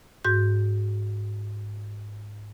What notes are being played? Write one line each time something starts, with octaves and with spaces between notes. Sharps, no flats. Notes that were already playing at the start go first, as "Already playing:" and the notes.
G#2 F#4 G6